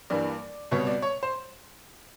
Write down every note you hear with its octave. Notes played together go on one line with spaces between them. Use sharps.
G2 E3 G3 A#3 D5
C2 B2 G3 B3 C#5
D5
C#5
C5